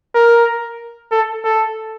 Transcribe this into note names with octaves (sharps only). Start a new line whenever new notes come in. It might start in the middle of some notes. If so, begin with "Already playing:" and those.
A#4
A4
A4